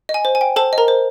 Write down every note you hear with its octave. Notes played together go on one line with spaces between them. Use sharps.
D#5
G#5
C5
G#5
G5
A4 C5 A5
D#5
A#4 A#5
C5